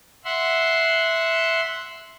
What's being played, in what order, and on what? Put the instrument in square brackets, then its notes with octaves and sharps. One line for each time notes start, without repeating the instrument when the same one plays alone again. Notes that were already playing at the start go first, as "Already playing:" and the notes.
[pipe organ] E5 F#5 C6